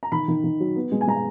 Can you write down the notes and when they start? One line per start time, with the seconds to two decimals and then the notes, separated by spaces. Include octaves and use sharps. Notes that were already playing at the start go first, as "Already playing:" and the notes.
0.03 A#5
0.12 D#3 B5
0.28 D#3
0.44 D#3
0.60 F#3
0.76 B3
0.92 G#3
1.01 G#5
1.07 G#3 A#5